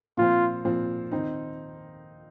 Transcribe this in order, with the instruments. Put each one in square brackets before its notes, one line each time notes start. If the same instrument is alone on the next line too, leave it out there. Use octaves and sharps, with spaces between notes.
[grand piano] A#2 F3 C4 [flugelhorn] F4
[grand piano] A#2 F3 C4
D#3 C4 D#4